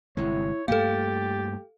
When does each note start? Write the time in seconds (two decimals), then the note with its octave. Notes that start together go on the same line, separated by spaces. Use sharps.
0.17 G1 C3 G#3 E4 C#5
0.68 G2 A3 A#3 G4 A4 F5 A6